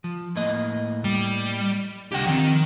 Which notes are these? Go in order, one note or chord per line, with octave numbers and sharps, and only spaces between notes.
F3
A2 A#3 D#5
G3
C2 D3 G4 F#5 G5
D#3 F3 C4